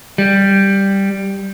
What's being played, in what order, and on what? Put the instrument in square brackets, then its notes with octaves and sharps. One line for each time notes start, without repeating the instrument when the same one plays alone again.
[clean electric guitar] G3